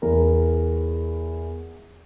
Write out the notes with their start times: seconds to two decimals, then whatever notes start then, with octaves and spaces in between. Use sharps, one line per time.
0.02 E2 A#4